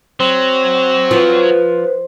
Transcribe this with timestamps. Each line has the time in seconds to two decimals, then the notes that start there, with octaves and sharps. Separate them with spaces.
0.20 F#3 C4
1.11 F3 B4